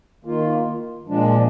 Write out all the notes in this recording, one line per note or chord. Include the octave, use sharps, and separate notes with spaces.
D#3 A#3 F4
A#2 F3 G#3 D4